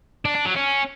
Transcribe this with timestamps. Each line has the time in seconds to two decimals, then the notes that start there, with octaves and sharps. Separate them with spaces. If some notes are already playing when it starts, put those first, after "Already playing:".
0.25 D4
0.35 D4
0.45 F#3
0.56 C#4